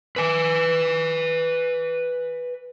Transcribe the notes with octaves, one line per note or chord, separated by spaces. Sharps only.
B4 G#5